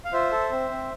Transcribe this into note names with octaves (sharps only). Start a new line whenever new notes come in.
F5
F4 C5 E5
A4
C4
C4